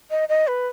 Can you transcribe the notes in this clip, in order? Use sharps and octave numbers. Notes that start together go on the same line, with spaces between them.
D#5
D#5
B4